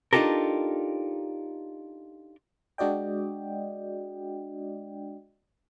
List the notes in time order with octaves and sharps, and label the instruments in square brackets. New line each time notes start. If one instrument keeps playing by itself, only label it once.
[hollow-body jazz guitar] D4 D#4 F4 G4 A4 A#4
[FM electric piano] G#3 D4 F#4 D5 D#5 G5